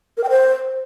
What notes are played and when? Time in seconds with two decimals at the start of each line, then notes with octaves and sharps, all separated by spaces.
0.17 A#4
0.24 G5
0.30 C5